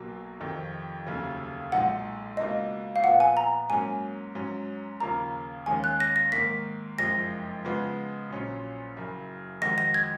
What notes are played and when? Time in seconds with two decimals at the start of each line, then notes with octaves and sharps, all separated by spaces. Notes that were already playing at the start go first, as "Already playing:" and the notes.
Already playing: B1 B2 F#3 A#3
0.40 F1 F2 D#3
1.06 F1 D#2 C#3 F#3
1.72 B1 A#2 G#3 D#4 F#5
2.37 C#2 B2 A#3 D#4 D#5
2.96 F5
3.04 A#2 F3 B3 F#5
3.20 G#5
3.37 A#5
3.70 G#2 F#3 A#3 C#4 G#5
4.35 G#2 F#3 C#4
5.00 D#2 C#3 F3 A#3 A#5
5.66 D#2 D#3 G#3 C#4 G#5
5.84 F#6
6.00 A#6
6.16 A#6
6.32 G#2 D#3 A#3 B6
6.98 F#1 F2 F3 G#3 A#6
7.65 C#3 F3 G#3 B3
8.30 A#1 A#2 F#3 C#4 F4
8.97 F#1 F#2 C#3
9.62 F2 D#3 G#3 D#4 F#4 A#6
9.78 A#6
9.94 G#6